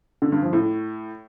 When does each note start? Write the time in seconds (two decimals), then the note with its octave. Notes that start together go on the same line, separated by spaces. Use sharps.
0.22 D3
0.32 G2
0.42 F3
0.53 A2